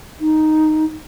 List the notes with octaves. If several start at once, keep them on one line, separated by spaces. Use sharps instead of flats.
D#4